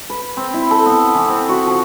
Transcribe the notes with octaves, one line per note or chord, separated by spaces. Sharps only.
B4
C4
E4
A4
B3
E3
C4
F#4
F3